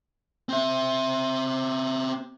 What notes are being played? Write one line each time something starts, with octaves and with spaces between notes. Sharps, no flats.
C4 E5